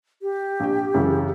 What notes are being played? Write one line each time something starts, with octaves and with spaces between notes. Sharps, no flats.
G4
A#1 G5
F#2 C#3 E3